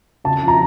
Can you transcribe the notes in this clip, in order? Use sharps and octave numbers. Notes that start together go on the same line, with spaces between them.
C#3 A5
F3
A#5